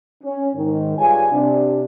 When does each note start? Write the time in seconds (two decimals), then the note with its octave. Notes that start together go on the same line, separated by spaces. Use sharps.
0.24 C#4
0.56 G#2 D#3
0.98 G2 F4 G#4 C#5 G#5
1.32 C3 D4